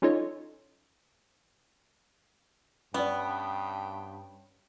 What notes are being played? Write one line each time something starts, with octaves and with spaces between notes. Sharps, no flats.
C#4 D#4 F4 A4 C#5 D#5
G2 B3 C#4 B4 D5 G5